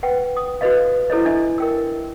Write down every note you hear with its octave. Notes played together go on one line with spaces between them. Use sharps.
B4 F#5 G5
D#6
F#4 A4 B4 D#5 F5
E4 A4 C5 C#5 D#5
D4 A4 D#5 E5
A#4 G5 E6